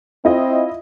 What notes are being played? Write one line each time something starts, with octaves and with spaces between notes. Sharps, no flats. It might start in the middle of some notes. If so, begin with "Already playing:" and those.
C4 E4 F4 D#5